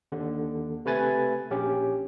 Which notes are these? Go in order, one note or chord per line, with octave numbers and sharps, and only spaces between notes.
D#2 D3
C3 A3 B4 G#5 A6
A#1 C#4 G4